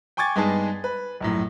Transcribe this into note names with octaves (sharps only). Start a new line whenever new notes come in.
G5 G#5 C#6 D6 G#6 A6
G2 G#3 B3 D#4 G#4 A5
B4
A#1 F#2 A2